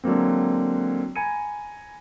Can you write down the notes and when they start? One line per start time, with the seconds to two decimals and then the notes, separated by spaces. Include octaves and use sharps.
0.04 D3 F#3 G#3 A#3 C4
1.16 G#5 A#5 B5 G#6 C#7 D#7